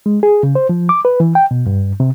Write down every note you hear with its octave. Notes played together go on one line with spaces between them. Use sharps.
G#3
G#4
C#3
C5
F3
D6
B4
E3
G5
B2
G2
C3